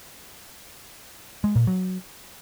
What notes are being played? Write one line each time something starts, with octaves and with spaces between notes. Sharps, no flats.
G#3
A#2
F#3